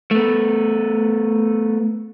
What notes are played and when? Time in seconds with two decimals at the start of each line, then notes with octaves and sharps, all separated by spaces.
0.11 A3 B3